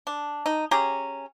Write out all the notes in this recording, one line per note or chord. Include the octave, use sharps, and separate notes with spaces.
D4
D#4
C#4 G4 G#4 A#5